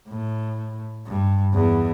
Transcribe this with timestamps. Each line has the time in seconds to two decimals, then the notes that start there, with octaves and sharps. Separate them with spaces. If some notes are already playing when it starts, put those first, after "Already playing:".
0.09 A2
1.06 G2
1.54 E2